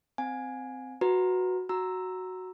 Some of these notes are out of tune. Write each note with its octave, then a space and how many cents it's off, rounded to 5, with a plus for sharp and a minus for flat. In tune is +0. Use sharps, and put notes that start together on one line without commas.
C4 -20 F5 +45 G#5 +0
F#4 -5 B4 +0 A#5 +0
F#4 +0 A#5 +0 E6 +0